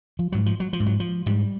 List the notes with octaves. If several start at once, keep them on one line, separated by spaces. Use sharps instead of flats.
F3
G#2 F#3
F3
F#3
F3
G#2
F#3
F3
G#2 G3